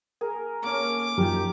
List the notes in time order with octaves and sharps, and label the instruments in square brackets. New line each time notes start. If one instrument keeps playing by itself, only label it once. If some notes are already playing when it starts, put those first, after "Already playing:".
[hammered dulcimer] G#4 [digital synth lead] A#4
[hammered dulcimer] A#3 C#4 A4 [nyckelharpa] D6
[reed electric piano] F#2 F3 [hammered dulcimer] D#3 A#4 [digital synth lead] G4